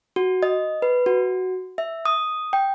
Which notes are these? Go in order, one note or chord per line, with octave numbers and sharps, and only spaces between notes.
F#4
D#5
B4
F#4
E5
D#6
G5